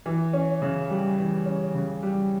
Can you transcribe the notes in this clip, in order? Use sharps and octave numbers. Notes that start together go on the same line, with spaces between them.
E3
C#4
C#3
G3
E3
C#4
C#3
G3